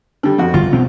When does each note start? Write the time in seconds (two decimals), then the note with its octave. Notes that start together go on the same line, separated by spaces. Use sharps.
0.23 D3 G3
0.38 F2 F#4
0.54 G1 F4
0.73 B2 C4